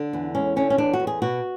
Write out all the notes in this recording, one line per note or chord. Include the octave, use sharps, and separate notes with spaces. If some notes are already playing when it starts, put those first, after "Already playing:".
Already playing: D3 D4
E2
G#3 C#4
D3 C#4
C#4
E2 D4
F#4
E2
G#4
B2 F#4